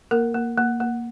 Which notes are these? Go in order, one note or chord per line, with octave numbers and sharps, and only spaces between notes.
A#3 A#4
A#3
A#3
A#3